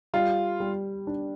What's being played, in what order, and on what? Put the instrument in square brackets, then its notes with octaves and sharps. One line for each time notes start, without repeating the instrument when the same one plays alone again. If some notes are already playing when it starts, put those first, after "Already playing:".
[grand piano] G3 [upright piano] F4
[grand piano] G3
D4